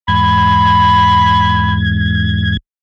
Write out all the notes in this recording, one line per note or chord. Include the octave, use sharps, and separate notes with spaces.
E2 G#2 B5 G#6